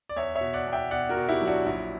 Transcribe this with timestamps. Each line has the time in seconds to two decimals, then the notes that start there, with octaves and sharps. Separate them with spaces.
0.09 D5
0.16 E2 C#5 E5
0.35 C#5 E5
0.41 B2
0.54 D5 F#5
0.67 E2
0.73 E5 G5
0.91 B2 D5 F#5
1.09 F#4 A#4
1.17 B2
1.29 E4 G4
1.42 F#3
1.47 D4 F#4
1.66 A#1 E4